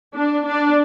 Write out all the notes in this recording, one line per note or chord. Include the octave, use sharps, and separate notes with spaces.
D4
D4